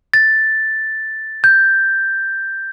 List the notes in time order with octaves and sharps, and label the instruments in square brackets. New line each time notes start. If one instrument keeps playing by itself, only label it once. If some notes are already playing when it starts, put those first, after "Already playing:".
[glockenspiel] A6
G6